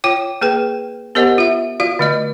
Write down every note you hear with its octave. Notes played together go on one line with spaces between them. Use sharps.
F4 C#5 G5 D6
A#3 G#4 B4 G5
B3 G4 A#4 C5 D#5 F#5
F4 E5
F4 F#4 D5 F5
D3 A3 D#5